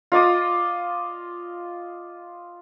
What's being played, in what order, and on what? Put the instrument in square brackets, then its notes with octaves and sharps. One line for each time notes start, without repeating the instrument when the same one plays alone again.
[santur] F4 D#5 D6 D#6